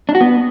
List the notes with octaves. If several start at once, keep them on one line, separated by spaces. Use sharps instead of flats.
D4
F#4
B3